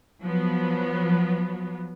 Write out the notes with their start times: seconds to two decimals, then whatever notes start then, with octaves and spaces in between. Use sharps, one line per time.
0.22 F3 F#3 B3